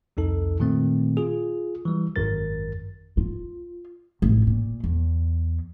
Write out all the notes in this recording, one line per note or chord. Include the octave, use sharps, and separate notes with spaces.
C2 F2 D#4 A4
A#2 D#3 A3 C4
F4 G#4
E3 G3
G#1 F#2 A#4 A6
F4
A1
A#2
E2